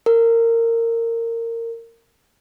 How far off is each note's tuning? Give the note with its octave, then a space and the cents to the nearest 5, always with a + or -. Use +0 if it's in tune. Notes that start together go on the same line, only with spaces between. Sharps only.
A#4 -20